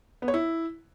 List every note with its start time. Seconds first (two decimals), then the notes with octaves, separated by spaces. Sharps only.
0.22 B3
0.28 C#5
0.34 E4